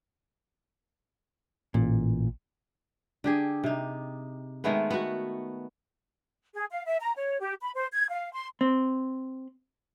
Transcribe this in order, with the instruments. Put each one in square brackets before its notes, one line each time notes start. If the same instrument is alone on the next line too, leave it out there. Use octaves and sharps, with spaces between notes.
[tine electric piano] A1 [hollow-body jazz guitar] A#2
[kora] D3 G4 G#4
C3 D#4
D#3 G#3 A3 B3
B3 F#4
[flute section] G#4
F5
E5
A#5
C#5
G4
B5
C5
G#6
F5
C6
[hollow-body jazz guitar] C4